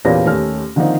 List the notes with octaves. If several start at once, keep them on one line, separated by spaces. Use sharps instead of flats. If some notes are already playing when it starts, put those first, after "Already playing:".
E2 A#2 A#3 C#4 G4 A#6
D#2 A3 C#4 G4 F6
D3 D#3 F3 A#3 C4 D#4